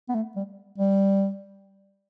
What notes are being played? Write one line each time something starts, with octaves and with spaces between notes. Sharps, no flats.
B3
A3
G3
G3